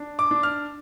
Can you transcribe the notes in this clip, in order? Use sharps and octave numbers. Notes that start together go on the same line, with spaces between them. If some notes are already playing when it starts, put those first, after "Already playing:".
Already playing: D4
D6
D4
F6